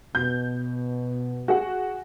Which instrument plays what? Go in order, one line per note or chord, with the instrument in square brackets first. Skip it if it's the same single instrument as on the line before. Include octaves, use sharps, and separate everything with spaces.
[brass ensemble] B2 [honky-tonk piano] G6
[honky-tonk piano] F#4 G#4 F#5